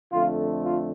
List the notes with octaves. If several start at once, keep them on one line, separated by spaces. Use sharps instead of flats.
F2 D3 A3 F4
F4